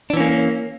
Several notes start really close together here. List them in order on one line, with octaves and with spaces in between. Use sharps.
D4 E3 C#4 A#3